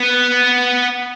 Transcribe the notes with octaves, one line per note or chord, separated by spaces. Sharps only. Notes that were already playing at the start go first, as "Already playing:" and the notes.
Already playing: B3